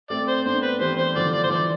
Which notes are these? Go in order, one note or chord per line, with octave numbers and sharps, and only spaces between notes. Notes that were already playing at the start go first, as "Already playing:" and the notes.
A3 C4 D5
C5
B3 D4 C5
B4
E3 G3 C5
C5
D3 F3 D5
D5
C5
E3 D5